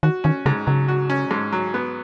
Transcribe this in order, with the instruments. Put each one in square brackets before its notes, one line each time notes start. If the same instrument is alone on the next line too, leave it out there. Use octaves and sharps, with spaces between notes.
[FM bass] D#3 [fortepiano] F#4
[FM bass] D#3 [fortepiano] C#4
[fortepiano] G#2 [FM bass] C#3
[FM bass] C#3 [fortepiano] F#3
[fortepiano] F#4
C#4
G#2
F#3
B3